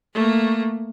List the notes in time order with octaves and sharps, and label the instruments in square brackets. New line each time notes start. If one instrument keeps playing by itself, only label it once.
[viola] A3 A#3